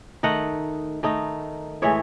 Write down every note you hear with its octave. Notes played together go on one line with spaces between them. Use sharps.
D#3 A3 D#4 D#5 F#5
D#3 A3 D#4
A2 E3 G#3 C#5 E5